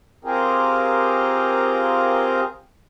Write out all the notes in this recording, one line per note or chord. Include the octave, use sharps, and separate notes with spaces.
C4 F4 G4 G#4 A#4